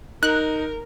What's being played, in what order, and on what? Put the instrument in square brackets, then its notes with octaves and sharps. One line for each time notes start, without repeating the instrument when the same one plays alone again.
[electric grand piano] D#4 [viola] A#4 [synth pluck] F#6